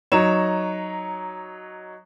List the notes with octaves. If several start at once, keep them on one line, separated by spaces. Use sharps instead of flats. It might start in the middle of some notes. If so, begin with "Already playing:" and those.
F#3 D#4 C#5 A#5 E7